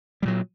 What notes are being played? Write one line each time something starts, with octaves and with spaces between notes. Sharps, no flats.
A#2 F#3 G3